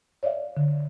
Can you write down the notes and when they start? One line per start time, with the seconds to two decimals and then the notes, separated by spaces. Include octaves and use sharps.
0.23 C#5 D5 E5 F5
0.57 D3